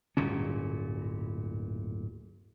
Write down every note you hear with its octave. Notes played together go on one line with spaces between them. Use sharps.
D1 G1 A#2 C#4